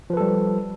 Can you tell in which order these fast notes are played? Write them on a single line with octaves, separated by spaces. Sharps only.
F3 B4 A4 G3